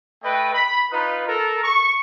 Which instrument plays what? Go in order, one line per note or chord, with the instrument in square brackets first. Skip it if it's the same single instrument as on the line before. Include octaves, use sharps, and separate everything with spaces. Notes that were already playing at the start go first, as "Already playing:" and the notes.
[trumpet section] A3 B4 D#5 G5
B5
D#4 F4 B4
A4 A#4
C#6